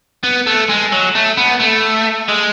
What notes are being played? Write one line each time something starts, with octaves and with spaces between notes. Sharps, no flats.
B3
A3
G#3
F#3
A3
B3
A3
G#3